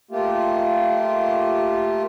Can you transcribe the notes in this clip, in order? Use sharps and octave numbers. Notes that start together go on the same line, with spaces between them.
A3 A#3 F4 G4